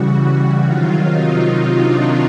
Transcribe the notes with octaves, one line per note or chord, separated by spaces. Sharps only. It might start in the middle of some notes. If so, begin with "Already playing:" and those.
Already playing: C#3 E3 G3 F#4
C3 D#3 F#3 F4
D#4
D#4
D4